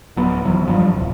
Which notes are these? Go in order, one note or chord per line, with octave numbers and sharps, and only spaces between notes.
D1 F#3 B3
E1 E3 F#3
G2 F3 G3
D1 C2